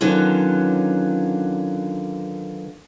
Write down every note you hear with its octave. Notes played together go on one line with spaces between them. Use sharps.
D3 D#3 F#3 B3 C#4 F4